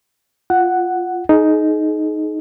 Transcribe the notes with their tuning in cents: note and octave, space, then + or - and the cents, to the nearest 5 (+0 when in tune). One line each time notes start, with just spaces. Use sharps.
F4 +0 F#5 +0
D#4 +0 G#4 +35